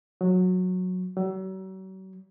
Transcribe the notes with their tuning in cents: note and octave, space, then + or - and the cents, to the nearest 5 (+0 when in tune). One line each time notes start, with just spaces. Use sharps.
F#3 -15
F#3 +40